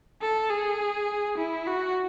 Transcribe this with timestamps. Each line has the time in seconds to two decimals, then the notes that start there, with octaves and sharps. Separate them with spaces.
0.22 A4
0.51 G#4
1.38 E4
1.67 F#4